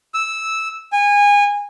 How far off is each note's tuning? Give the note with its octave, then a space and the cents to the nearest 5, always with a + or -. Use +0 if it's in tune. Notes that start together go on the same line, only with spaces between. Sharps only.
E6 -10
G#5 -25